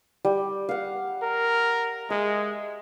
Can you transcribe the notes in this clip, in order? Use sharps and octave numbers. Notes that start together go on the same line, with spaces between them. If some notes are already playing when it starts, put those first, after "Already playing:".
G3
F5 F#5
A#4
G#3 E5